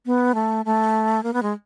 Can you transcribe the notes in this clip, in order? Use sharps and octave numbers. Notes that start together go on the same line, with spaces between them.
B3
A3
A3
A#3
B3
G#3